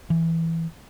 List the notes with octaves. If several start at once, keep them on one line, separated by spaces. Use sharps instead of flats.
E3